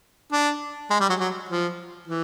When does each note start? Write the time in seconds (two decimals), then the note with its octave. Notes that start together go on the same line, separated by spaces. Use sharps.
0.32 D4
0.90 G#3
1.00 G3
1.09 F#3
1.19 F#3
1.49 F3
2.07 E3